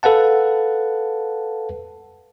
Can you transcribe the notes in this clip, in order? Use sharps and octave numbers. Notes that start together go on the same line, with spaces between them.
A4 B4 F5 F#5 A5